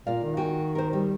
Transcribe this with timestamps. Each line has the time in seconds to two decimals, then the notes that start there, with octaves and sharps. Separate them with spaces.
0.07 A#2 A#4 D5 F5
0.24 D#3
0.37 F#4 G5 G#5
0.75 A#4 C5
0.93 G3